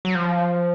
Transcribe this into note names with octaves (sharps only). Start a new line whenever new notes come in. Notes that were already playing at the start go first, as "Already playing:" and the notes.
F#3
F3